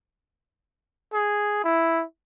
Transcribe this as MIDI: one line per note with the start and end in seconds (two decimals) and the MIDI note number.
1.13 1.61 68
1.64 2.04 64